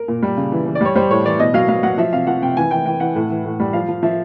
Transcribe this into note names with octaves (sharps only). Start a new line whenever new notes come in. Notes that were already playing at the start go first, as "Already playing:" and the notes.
Already playing: A#4
A#2
G3
C#3
E3
E3
D5
G3 C#5
G3 C5
A2 C#5
E3 D5
B2 D#5
F#3 F5
F#3 F5
F#3 F#5
F3 E5
C3 F5
F3 F#5
C3 G5
E3 G#5
E3 G5
E3 G5
E3 F#5
A2
E3
A2
G3
F3 F5
F3
F3 E5